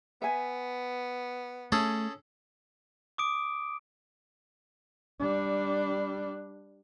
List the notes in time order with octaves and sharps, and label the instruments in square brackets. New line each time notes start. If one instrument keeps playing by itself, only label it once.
[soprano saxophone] B3 [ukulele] E5 G#5
[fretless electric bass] A3 [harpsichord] C#4 G#4 A4
[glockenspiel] D6 D#6 D7
[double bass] G3 D4